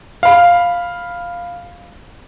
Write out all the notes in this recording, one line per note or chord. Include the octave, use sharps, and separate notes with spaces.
F5 B5